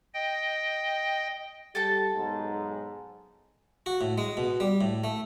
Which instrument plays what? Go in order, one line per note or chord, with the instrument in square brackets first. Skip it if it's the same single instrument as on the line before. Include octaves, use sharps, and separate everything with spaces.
[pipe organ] D#5 G5
[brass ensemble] G3 G4 [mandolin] A4 G5 A5
[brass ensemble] B1 G#2
[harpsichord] F#4
A2
G#3
B2
G3
A2
A3